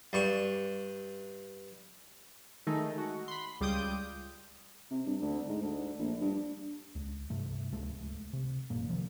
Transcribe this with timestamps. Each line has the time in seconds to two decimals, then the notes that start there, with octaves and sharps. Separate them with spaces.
0.13 G2 C#6
2.67 D#3 G#3 A3 D#4
2.98 F#4
3.28 B5 C6
3.61 C#2 G3 F4 D6 D#6 G6
4.91 C3
5.06 G2
5.22 D2
5.48 G#2
5.62 D2
5.99 A#1
6.21 G2
6.95 C#2
7.30 G2 C3 A3
7.72 D1 C#2 G#3 A3
8.33 C3
8.70 A1 F#2 A#2 A#3
8.89 C3 D#3 F3